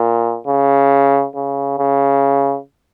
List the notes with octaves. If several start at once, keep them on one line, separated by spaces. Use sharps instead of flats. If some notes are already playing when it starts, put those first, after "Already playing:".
Already playing: A#2
C#3
C#3
C#3